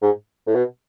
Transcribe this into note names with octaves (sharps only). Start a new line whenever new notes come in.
G#2
A2
B2